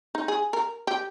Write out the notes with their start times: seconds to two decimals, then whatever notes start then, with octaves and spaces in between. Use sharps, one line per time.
0.15 D#4
0.28 G#4
0.53 A#4
0.87 G4